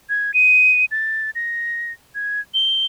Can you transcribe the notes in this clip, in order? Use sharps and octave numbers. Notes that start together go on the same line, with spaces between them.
G#6
D#7
A6
A#6
G#6
G7